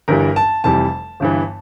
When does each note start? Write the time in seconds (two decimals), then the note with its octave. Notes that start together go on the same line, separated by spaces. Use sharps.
0.08 G1 G2 E3 G3 A#4
0.36 A5
0.64 F1 F2 E3 G3 A5
1.20 G1 G2 E3